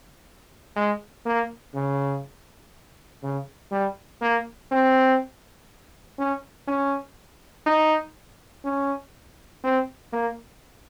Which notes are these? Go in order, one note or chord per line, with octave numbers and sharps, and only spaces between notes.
G#3
A#3
C#3
C#3
G3
A#3
C4
C#4
C#4
D#4
C#4
C4
A#3